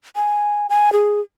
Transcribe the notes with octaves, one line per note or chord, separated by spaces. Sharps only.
G#5
G#5
G#4